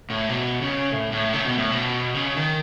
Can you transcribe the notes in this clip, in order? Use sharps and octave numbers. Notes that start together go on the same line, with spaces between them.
A2
B2
C#3
A2
A2
C#3
B2
A2
B2
C#3
D#3